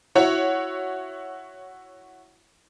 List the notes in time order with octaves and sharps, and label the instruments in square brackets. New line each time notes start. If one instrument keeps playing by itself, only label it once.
[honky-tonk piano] E4 F#4 C#5